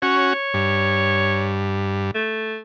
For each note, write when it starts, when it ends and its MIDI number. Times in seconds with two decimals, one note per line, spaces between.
0.02 0.33 61
0.02 0.33 66
0.02 1.66 73
0.54 2.11 43
2.15 2.60 57